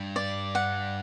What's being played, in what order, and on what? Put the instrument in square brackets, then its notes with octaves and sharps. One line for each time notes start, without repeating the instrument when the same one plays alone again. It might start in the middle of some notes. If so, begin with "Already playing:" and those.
Already playing: [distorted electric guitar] G2
[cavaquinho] D5
F#5